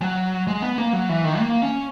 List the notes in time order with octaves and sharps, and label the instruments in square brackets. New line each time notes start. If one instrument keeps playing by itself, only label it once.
[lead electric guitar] F#3
G#3
B3
A#3
F#3
E3
D#3
A#3
C#4